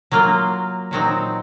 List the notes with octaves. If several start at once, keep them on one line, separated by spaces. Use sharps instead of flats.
F#3 A#3 F4
A#2 F#3 C4 D#4